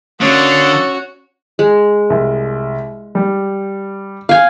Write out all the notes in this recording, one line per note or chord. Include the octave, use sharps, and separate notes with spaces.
D3 A#3 C#4 F#4 A4 C#5 D#6
G#3
C2
G3
F5 G#5